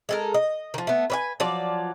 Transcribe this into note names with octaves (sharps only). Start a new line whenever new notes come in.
G#3 A4 A#4
D#5
D#3 F3
A3 B3
B4 C#5 G#5
F3 F#3 D5